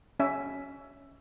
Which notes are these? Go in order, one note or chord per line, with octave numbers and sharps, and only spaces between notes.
C#4 E5